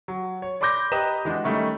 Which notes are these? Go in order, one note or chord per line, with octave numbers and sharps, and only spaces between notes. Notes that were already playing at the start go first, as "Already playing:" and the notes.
F#3
C#5
D5 B5 C6 D6 G6 A#6
G4 B4 D#5 A#5 D#6 E7
E3 G#3 D4 F#4
D#3 G3 A3 C#4 D#4